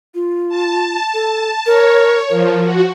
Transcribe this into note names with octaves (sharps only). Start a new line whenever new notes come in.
F4
A5
A4
A#4 C#5
F3 A#4
F#4